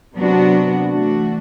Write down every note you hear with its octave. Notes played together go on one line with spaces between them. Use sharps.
C3 F#3 B3 D4 F#4
E3 A3 D4 F#4